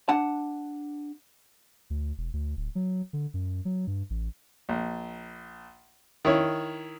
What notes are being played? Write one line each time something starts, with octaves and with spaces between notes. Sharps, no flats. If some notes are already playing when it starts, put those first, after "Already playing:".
D4 F#5 A5
D2
E1
D2
D1
F#3
D3
F#2
F#3
G2
A1
A#1
D#3 E4 C#5